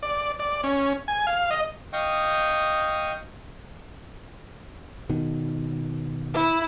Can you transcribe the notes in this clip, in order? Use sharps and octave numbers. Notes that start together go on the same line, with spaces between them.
D5
D5
C#4
G#5
F5
D#5
D#5 F5 G5 C#6 D#6
B2 D#3
E4